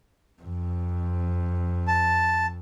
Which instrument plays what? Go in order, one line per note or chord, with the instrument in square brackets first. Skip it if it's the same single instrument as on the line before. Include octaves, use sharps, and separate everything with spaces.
[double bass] F2
[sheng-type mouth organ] A5